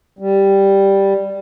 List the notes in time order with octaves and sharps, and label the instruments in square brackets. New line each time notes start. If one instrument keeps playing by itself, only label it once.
[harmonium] G3